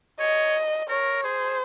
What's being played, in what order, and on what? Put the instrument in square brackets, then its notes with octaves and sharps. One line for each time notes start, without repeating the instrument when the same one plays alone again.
[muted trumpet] C#5 [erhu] D#5
[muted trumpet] A#4 [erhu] C#5
[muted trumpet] G#4 [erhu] C5